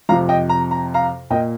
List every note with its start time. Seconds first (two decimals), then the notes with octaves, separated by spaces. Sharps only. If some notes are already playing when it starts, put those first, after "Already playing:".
0.09 F2 C3 F3 F5 A#5
0.29 D#5 G5
0.49 A#5
0.71 A#5
0.94 F5 A#5
1.30 A#2 A#3 D#5 G5